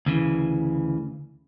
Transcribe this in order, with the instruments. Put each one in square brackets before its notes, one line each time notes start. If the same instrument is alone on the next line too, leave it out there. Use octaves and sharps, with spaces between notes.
[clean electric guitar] D2 C#3 E3